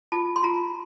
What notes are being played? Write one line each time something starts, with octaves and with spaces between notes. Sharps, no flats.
F4 A5
C6
F4 A#5